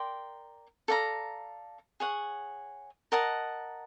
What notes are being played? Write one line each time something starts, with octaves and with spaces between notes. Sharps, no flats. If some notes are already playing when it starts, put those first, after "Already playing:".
Already playing: A#4 D5 G5 C6
A4 D5 F5 A#5
G#4 C#5 F#5
A#4 D#5 F#5 A5